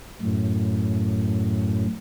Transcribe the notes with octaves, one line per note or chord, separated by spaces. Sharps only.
F#2 A2